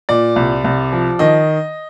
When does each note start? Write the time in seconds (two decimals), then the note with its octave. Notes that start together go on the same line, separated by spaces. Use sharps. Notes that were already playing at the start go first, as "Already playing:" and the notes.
0.09 A#2 D5
0.36 C2
0.64 C2
0.93 F3
1.19 D#3 D#5